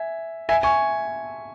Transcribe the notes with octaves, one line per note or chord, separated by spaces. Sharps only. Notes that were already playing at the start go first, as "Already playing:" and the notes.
Already playing: E5 G#5
E5 G#5
G#5 C#6